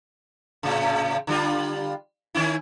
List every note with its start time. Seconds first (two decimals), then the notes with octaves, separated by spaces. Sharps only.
0.63 A2 C#3
1.27 D3 G3 F4
2.35 D#3 C#4 E4